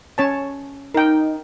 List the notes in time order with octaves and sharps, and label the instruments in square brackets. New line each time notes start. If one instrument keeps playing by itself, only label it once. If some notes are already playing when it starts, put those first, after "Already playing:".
[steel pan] C#4 C#5 A5
[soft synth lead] D#4 [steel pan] A#4 G5